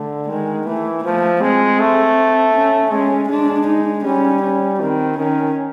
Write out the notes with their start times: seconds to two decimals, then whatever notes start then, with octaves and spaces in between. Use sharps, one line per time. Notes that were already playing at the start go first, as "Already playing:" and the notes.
Already playing: D3 A3
0.29 D#3 G#3
0.66 E3 A3
1.04 F3 A3
1.41 G#3 C4
1.80 A3
2.54 C#4
2.92 G#3 C#4
3.29 G#3 D4
3.67 D#4
4.05 G3 C#4
4.43 C#4
4.80 D#3 C4
5.18 D#3 C#4